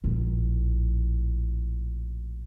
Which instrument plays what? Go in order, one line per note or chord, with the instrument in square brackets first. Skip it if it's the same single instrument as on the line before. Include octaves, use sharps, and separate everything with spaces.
[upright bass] A#1 A2